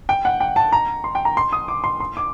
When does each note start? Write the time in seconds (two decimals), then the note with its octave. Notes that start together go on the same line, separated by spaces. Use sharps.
0.09 G5
0.25 F#5
0.40 G5
0.56 A5
0.73 A#5
1.04 C6
1.15 G5
1.25 A#5
1.37 C6
1.53 D#6
1.68 D6
1.84 C6
2.00 C6
2.17 D6